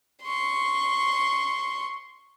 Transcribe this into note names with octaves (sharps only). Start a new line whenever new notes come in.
C6 C#6